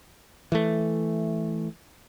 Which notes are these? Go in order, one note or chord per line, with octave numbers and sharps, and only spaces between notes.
E3 A3